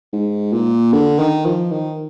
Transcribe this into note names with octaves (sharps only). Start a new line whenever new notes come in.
G#2
A#2
D3
D#3
F3
D#3